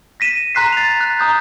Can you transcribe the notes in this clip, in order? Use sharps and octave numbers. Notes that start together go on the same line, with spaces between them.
A#6 B6 D#7 E7
A#5 C6 F#6 B6 C7
A6 F7
F#6
A#5 D#6 G6